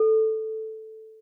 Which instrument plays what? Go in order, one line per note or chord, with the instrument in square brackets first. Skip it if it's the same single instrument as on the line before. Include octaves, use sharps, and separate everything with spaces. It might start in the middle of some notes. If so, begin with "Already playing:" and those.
Already playing: [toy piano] A4